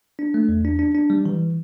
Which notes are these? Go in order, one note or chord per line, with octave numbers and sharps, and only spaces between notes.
D4
A3
E2
D4
D4
D4
G3
E3